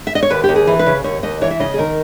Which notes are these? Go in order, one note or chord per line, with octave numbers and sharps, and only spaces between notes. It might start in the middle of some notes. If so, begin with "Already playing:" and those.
E5
D#5
C#5
D#2 B4
G4
D#2
G#4
E3
B4
C#3
D#2 C#5
D#2 D#5
E3 C#5
E5
C#3 D#5
G#4
D#3 A#4